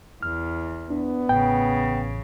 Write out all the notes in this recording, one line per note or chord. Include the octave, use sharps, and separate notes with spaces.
E2 F6
B3 D4
A1 C#3 G5